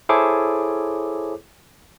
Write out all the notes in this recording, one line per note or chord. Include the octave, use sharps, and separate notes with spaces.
E4 G#4 A4 C5 C#5 D6